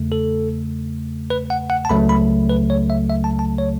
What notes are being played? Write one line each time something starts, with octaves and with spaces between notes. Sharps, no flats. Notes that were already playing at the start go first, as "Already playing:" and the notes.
Already playing: E2 C#3 A3
A4
B4
F#5
F#5
A5
C#2 C#3 F#3 A3 B5
B5
B4
C#5
E5
E5
A5
A5
C#5